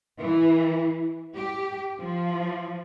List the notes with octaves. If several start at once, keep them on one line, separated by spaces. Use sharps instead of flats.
E3
G4
F3